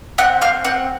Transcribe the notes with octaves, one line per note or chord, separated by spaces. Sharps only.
C4 F#5
C4 F5
C4 F#5